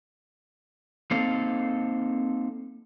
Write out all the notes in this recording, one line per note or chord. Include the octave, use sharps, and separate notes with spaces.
A#3 C4 D#4 A4 F5